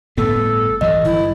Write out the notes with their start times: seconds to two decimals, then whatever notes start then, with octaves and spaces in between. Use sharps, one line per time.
0.17 G1 A2 B3 A4
0.81 B1 E3 F#3 D#5
1.05 G1 E4